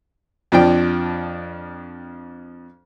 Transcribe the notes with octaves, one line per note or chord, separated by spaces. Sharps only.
F2 F3 D4 G5